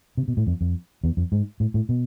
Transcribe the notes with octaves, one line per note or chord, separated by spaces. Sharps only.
C3
B2
A2
F2
F2
E2
F2
G#2
A2
A2
B2